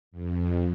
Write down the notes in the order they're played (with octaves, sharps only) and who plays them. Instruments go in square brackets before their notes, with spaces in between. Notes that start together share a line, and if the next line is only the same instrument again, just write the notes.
[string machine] F2